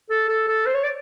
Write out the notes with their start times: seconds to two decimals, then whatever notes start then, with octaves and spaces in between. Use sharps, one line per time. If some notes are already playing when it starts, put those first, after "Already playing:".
0.10 A4
0.28 A4
0.47 A4
0.66 C5
0.74 C#5
0.84 D5